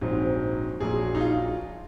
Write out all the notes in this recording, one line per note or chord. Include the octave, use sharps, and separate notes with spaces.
A#1 G#2 F#3 C4
A#1 A#2 F#3 G#4
D#4
F4